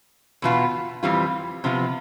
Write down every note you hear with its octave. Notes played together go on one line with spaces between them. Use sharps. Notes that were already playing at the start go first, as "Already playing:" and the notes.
E2 B2 B3 F4
F2 E3 G3 C4 F4
C3 F3 B3 F4